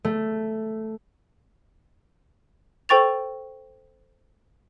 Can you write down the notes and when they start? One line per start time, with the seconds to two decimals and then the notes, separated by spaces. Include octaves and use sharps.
0.05 A3
2.89 A4 C5 G5 C#6 A6 F7